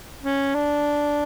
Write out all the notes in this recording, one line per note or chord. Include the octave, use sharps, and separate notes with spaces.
C#4
D4